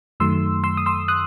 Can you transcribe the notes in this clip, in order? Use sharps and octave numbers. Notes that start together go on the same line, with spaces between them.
F#2 D#3 F#3 A3 C6 E6
C6 E6
D#6
C6 E6
D#6 F#6